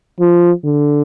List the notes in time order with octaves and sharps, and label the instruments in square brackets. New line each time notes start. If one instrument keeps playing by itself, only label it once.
[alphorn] F3
D3